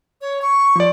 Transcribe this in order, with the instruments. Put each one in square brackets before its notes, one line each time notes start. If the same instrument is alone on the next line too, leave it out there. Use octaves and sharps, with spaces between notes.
[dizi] C#5
C#6
[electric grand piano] F3 D5